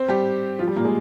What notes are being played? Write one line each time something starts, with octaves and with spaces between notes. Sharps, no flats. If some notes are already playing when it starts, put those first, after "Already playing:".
Already playing: C4 C5
G3 G4
F3 F4
G3
A#2 A#3
G#3 G#4